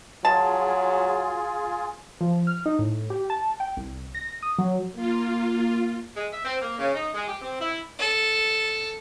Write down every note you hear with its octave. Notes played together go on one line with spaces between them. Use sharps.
F#3 F4 G#4 A5
F3
F6
D#4
A2
G4
A5
G5
C2
A#6
D#6
F#3
A#3 F4
G#3
E5
C4
A#3
C#3
D#4
G#3
G4
C4
E4
A4